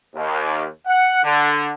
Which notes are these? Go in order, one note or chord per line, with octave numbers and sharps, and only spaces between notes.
D#2
F#5
D3